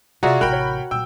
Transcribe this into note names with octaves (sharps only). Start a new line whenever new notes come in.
C3 F4 F#4 G#4 D5 E5 A#5
A1 C3 A#4 G5 B5 F#6
C#5
A#2 F#3 G5 E6